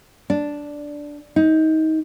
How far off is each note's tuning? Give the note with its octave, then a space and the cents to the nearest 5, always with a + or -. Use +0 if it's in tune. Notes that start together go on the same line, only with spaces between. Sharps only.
D4 -5
D#4 +25